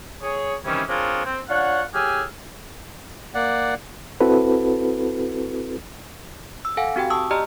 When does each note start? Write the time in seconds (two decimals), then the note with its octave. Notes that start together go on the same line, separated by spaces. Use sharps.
0.22 G#4 C#5
0.65 C3 D#3 E3 G3 C#4
0.89 C4 D4 F4 G#4 A#4 C#5
1.26 C4
1.49 D4 F4 C#5 F#5
1.94 A2 G4 G#4 G#5 E6 F6
3.35 A#3 D5 F#5
4.21 C4 E4 F#4 A4 B4
6.65 E6
6.77 A4 F5 F#5 G#5
6.96 C4 F#4 G4 G5
7.10 A5 C#6 D#6 E6
7.31 G4 D5 D#5 A#5 F6